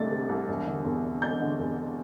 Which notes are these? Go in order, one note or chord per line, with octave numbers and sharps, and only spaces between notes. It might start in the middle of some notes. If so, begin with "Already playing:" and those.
Already playing: C2 C3 A3 D4 A6
C3
C2
E1
D3
E2
E1
E1 G6
D3
E2